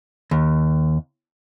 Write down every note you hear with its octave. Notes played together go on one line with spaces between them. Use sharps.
D#2